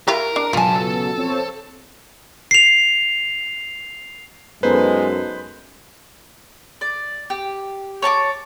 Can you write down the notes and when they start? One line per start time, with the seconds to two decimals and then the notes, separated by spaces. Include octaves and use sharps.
0.08 E4 F4 G4 A#4
0.36 D4
0.53 C#2 G2 B2 F#3 F4 G#5 A5
0.75 A4
1.16 F3 C4 C#5
2.51 C7 F7
4.63 F#2 G#3 B3 D#4 A4 B4 C5
6.81 D5
7.30 G4
8.02 C#5 A5 A#5 D6